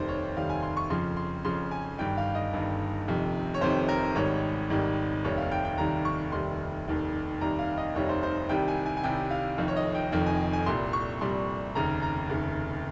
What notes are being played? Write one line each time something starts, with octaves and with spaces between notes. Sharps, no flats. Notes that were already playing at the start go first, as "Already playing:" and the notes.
Already playing: F1 D#2 D#3 G3 C5
C#5
F1 D#2 D#3 G3 F5
G#5
C6
C#6
F2 C#3 F3 C6
C6
F2 C#3 F3 C6
G#5
G1 G2 D#3 G5
F5
D#5
G1 G2 D#3
F1 F2 C3 D#3
C#5
F1 F2 C3 D#3 C5
A#4
G#1 G#2 D#3 G3 C#5
G#1 G#2 D#3 G3
F1 D#2 D#3 G3 C#5
F5
G5
G5
F1 D#2 D#3 G3 A#5
C#6
F1 D#2 D#3 G3 C6
F1 D#2 D#3 G3
F1 D#2 D#3 G3 A#5
F5
D#5
F1 D#2 D#3 G3 C#5
C5
C5
C2 C3 D#3 G3 G5
G#5
G#5
G#5
C2 C3 D#3 G3 G5
F5
F1 F2 D#3
C#5
D#5
G5
F1 F2 D#3 G5
G#5
G#5
C2 A#2 G3 C6
C#6
C2 A#2 G3 C6
F1 D#2 C#3 A#5
A#5
F1 D#2 C#3